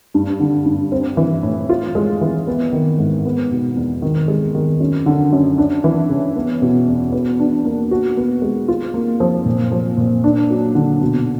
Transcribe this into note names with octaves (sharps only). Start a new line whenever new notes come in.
G2
D3
G2
C4
E3
A2
F4
G#3
E3
B3
D#3
G#2
B3
B2
E2
D#3
G#3
D#3
F#2
D3
F#2
D4
E3
C#3
B3
B2
E2
B4
D4
A#3
F#4
B3
G#3
F4
A#3
F3
A#2
F3
A#2
D4
F#3
D3
B2